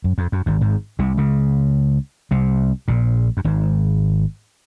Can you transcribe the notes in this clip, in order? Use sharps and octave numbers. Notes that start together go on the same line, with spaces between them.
F#2
F2
F#2
G#1 G#2
G#1 G#2
C2 C3
C#2 C#3
C2 C3
A#1 A#2
F#2
G#1 G#2